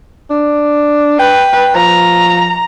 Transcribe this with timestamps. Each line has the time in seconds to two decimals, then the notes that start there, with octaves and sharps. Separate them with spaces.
0.30 D4
1.19 B4 G5
1.76 F3 A#5